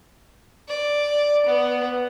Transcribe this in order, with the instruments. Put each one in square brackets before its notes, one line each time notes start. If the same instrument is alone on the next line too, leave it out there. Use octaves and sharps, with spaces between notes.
[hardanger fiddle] D5
B3